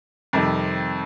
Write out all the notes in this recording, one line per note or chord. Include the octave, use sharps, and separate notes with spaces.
F2 C3 D#3 G3